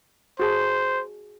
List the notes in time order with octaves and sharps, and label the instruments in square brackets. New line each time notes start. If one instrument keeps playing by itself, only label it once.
[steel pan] F#4 G#4 A5 [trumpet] C5